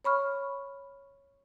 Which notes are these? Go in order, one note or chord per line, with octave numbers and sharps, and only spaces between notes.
C#5 B5 C#6 F6